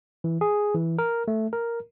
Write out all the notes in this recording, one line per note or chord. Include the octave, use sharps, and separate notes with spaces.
E3
G#4
E3
A#4
A3
A#4